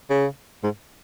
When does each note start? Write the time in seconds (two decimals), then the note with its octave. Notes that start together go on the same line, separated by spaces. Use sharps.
0.10 C#3
0.63 G#2